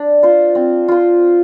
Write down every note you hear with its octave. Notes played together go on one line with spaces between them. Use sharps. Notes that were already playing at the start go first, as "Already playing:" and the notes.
Already playing: D4
F4 C5
C4
F4 C5